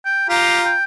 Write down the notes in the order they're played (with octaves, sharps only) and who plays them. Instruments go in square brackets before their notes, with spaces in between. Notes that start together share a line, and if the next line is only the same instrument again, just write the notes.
[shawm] G5
[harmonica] F4 A#5 [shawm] G4
[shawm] G5